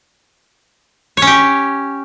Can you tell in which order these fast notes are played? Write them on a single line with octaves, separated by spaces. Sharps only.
C#5 C#4 G4